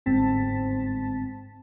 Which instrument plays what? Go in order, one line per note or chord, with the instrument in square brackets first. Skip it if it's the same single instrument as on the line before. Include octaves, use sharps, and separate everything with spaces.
[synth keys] G1 G#2 C4 A5 A6 B6